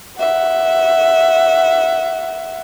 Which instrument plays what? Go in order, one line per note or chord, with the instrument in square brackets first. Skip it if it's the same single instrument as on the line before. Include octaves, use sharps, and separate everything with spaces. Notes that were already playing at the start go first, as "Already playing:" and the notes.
[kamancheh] E5 F#5